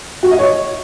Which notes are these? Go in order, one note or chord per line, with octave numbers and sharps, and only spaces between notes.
F#4
D#5
C#5